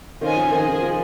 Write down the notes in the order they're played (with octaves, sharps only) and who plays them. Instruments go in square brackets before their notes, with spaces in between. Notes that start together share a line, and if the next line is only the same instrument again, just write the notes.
[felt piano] D#3 [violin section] C#4 F4 C5 D#5 G#5
[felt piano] F3
[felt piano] D#3 [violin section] G#4 C5 D#5 G#5
[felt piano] D#3
F3